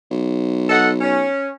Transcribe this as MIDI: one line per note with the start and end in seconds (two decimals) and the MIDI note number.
0.11 1.26 35
0.70 0.90 69
0.70 0.90 75
0.70 0.90 78
1.01 1.49 61